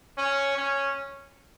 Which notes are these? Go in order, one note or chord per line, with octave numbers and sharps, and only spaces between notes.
C#4
C#4